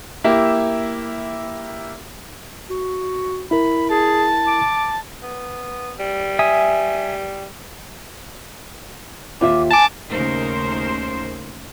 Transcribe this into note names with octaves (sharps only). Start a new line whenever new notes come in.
A#3 E4 G4 E5
F#4
E4 A#4 B5
G#4 A5
D6
B3
G3
E5 G#5 D#6
D#2 F4 E5 D6
G#5 A5 D6
D#2 C#3 A3 D#4 A#4 C5